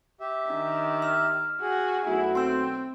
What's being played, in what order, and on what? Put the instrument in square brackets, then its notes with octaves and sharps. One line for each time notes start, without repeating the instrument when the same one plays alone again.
[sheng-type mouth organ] G4 E5
[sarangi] D#3 [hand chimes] D4
[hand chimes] E6 F6
[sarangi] F#4 [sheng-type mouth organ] G#4
[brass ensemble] B1 A3 F#4 [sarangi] E4
[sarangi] C4 [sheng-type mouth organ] G5 [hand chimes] C6 E6